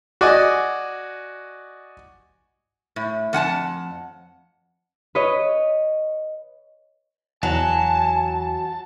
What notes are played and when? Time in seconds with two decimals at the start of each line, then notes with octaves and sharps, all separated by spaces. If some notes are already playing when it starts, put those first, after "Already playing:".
0.21 F#4 D5 D#5 G#5
2.96 A2
3.33 F2 F#5 G#5 A5
5.15 B4 C#5 D#5
7.43 E2 E3 F#3 G#5 A5